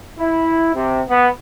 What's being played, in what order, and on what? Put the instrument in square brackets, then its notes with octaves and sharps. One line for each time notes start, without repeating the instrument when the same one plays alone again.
[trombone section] E4
C3
B3